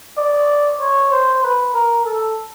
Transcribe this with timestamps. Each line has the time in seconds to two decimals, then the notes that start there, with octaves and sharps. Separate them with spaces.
0.18 D5
0.80 C#5
1.11 C5
1.43 B4
1.74 A#4
2.05 A4